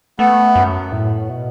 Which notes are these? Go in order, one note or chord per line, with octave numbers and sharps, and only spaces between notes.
A3 B3
F#2
A2
B2